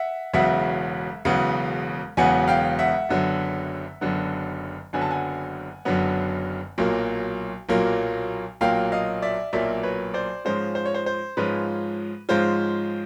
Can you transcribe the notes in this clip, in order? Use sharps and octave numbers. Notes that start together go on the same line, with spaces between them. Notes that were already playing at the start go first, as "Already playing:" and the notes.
Already playing: E5 F#5
E1 E2 C#3 F#3 B3 E5 F#5
E1 E2 C#3 F#3 B3
E1 E2 C#3 F#3 B3 F#5 G#5
F5 G5
E5 F#5
F#1 F#2 D3 F#3 B3
F#1 F#2 D3 F#3 B3
F#1 F#2 D3 F#3 B3 G#5
A5
F#5 G#5
F#1 F#2 D3 F#3 B3
B1 A#2 F#3 A#3
B1 A#2 F#3 A#3
B1 A#2 F#3 A#3 F5 G5
D#5 F5
D5 E5
B1 A#2 F#3 A#3 D5 E5
B4 C#5
C5 D5
G#2 F3 G#3 C#4 F4 C5
C5
C#5
C5
C5
G#2 F3 G#3 C#4 F4 B4
G#2 F3 G#3 C#4 F4 C5